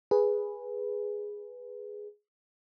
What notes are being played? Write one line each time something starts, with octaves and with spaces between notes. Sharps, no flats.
G#4 B4